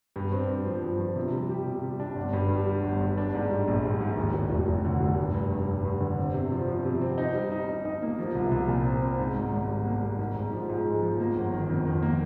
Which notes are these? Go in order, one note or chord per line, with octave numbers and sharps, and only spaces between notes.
G2
C4
G2
F3
G2
F3
C3
G3
G4
C3
G3
D4
G1
G2
G3
G3
G1
G2
D4
G#2
G3
A#1
G3
G#2
D#2
F1
F1
F1
D3
F1
G2
G2
G2
G2
G2
D3
C4
C3
F3
F3
C3
C4
D#4
G3
D#4
D#4
D#4
A#3
F3
C2
C2
A#2
C4
C4
G#2
G#1
G#1
G3
A#3
G3
G#2
G#2
F3
G#2
G#3
F3
A#3
G1
D#3
F2
D#3
A#3